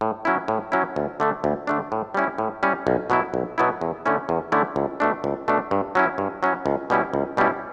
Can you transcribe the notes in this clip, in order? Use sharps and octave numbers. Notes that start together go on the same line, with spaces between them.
A2
F#3 C#4 E4
A2
F#3 C#4 E4
D2
D3 A3 D4
D2
D3 A3 D4
A2
G3 C#4 E4
A2
G3 C#4 E4
B1
B2 F#3 B3 E4
B1
B2 F#3 B3 E4
E2
D3 A3 C#4 E4
E2
D3 A3 C#4 E4
C#2
B2 A3 D4
C#2
B2 A3 D4
G2
F#3 C#4 E4
G2
F#3 C#4 E4
C#2
B2 G3 C#4 E4
C#2
B2 G3 C#4 E4